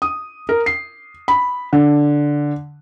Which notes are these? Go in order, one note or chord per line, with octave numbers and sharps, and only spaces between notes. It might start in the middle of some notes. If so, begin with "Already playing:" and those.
D#6
A#4
C7
B5
D3